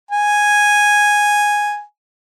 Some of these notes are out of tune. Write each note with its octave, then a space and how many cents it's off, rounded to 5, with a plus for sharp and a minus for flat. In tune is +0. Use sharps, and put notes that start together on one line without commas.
G#5 -5